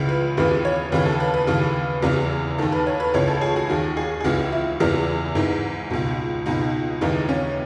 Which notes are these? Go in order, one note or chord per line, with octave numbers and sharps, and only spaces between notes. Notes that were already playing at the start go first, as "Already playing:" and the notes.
Already playing: C#2 C#3 E3
B4
D#2 C#3 E3 B4
C#5
D#2 C#3 E3 B4
A4
B4
B4
D#2 C#3 E3
E2 C#3 E3
D#2 D#3 A4
B4
C#5
B4
C#2 C#3 E3 C#5
A4
G#4
F#4
D#2 D#3 F#4
G#4
G#4
C#2 C#3 E3 F#4
E4
E2 C#3 E3
G#2 E3 D#4
C#2 B2
C#2 B2 D#4
D#2 C#3 E3 D#4
C#4